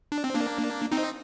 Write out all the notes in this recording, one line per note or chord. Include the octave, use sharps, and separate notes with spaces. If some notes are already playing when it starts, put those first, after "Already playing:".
D4
C4
A#3 D4
C4 D#4